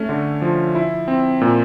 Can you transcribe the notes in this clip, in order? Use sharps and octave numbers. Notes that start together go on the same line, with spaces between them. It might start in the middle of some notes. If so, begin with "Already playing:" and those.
Already playing: A3 C#4
D3
F3
E4
C4
A#2